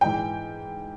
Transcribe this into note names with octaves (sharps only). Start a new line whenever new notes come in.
G#2 E3 G5